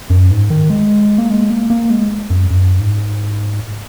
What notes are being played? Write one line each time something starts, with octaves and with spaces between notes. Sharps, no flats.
F#2
G#2
D#3
G#3
A#3
G#3
A#3
A#3
G#3
F#2
F#2
G#2